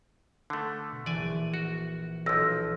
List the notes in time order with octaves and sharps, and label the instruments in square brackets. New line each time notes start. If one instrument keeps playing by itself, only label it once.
[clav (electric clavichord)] D3 A3
[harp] B2
[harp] A#1 E3 [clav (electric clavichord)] D5 G#5
[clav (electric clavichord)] F#4
[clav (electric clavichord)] B1 F3 [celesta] E6 A#6